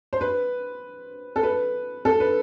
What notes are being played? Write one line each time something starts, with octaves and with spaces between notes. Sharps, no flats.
C5
B4
A4
B4
A4
B4